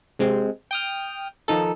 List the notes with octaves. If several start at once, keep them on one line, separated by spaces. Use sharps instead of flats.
C3 G#3 C4
G5 D#6 F6
D#3 F3 D#4 A4